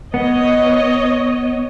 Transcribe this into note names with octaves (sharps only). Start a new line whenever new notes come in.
B3 C#5 D#5